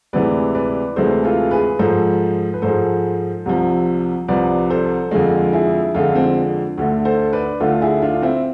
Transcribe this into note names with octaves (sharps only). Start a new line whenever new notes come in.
D2 C3 E3 G#3 B4 D5
B4 D5
D2 C3 E3 G#3 A4 C5
F4 A4
G#4 B4
G#2 F3 G#3 A4 C5
B4
G#2 F3 G#3 A4 C5
C2 C3 F3
C2 C3 F3 B4 D5
A4 C5
F2 D3 G#3 F4 A4
E4 G#4
F2 D3 G#3 F4 A4
C4
D2 D3 A3
A4 C5
B4 D5
D2 D3 A3 F4 A4
E4 G#4
D4 F4
C4 E4